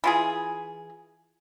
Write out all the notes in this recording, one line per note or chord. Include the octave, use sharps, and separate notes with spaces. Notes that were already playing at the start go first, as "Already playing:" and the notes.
E3 F4 G#4